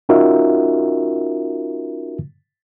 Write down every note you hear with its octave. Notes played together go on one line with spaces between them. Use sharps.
C#4 D#4 F4 F#4 A#4 E5